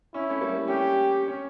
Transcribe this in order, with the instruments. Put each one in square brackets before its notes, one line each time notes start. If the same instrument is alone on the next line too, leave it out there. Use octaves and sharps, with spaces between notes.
[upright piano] C#4 [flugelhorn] E4
[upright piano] A3 C#4
G3 A#3
[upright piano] A3 C#4 [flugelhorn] G4
[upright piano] C#4